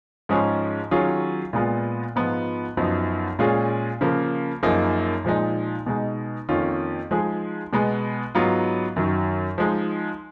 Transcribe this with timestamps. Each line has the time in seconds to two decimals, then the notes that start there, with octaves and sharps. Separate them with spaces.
0.29 G#2 F3 G#3 C#4 G#4
0.91 D#3 F#3 C#4 F4 G#4
1.53 A#2 G#3 B3 F4
2.16 G#2 F3 B3 F4
2.77 F#2 F3 B3 D#4 F#4
3.39 A#2 G#3 C#4 F4 G#4
4.01 C#3 F3 A#3
4.63 F#2 F3 A#3 D#4 G#4
5.24 A#2 F3 G#3 D#4
5.86 B2 G#3 D#4
6.49 F2 D#3 A#3 C#4 F4
7.11 F3 G#3 D#4 G#4
7.73 B2 G#3 B3
8.35 G#2 F#3 B3 F4
8.96 F#2 D#3 F#3
9.58 F3 G#3 D#4